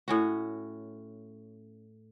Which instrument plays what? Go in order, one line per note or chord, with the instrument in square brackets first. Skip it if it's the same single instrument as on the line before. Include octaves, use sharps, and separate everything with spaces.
[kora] A2 C#4 F#4